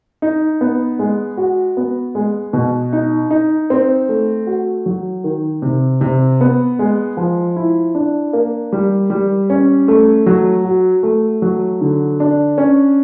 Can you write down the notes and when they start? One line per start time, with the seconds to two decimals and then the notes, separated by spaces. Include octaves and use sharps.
0.22 D#4
0.61 B3
0.99 G#3
1.37 F#4
1.77 B3
2.15 G#3
2.53 B2
2.93 D#4
3.31 D#4
3.70 C4
4.09 A3
4.47 F#4
4.86 F#3
5.24 D#3
5.62 C3
6.01 C3
6.41 B3
6.79 G#3
7.17 F3
7.56 E4
7.95 D4
8.33 A#3
8.72 G3
9.10 G3
9.50 C#4
9.88 A3
10.26 F#3
10.64 F#4
11.03 A3
11.42 F#3
11.81 D3
12.20 D4
12.58 C#4